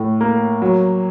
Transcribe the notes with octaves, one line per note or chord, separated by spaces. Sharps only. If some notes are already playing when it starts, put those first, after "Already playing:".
Already playing: A2
A#3
F#3